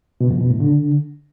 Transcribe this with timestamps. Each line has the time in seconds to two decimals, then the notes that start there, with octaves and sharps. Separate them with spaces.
0.21 B2
0.30 F2
0.40 B2
0.50 A2
0.60 D3